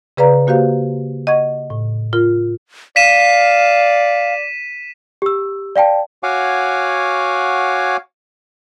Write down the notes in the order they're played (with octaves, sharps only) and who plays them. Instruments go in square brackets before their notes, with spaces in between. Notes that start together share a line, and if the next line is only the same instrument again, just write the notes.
[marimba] C#3 G#4 B4 D5 F5 A#5
A#3 F#4 G4 C5 F5
D#5 F#5 C#6 G#6
A2
F4 A#4
[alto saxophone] D5 [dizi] F5 [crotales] B6 D#7 E7
[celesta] G4 E6
D5 F5 G5 A5
[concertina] F#4 C#5 F5 F#5 G#5 D6